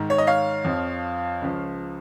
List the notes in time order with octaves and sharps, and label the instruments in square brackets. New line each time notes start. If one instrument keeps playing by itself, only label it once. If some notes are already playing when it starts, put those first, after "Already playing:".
Already playing: [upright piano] G#2 D#3
C#5
D#5
C#5 F5
F2 F3
C#2 C#3 F3